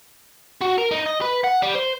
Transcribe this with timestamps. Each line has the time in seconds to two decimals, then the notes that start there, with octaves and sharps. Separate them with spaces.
0.62 F#4
0.78 A#4
0.92 D#4
1.06 D#5
1.22 B4
1.44 F#5
1.63 G3
1.75 C5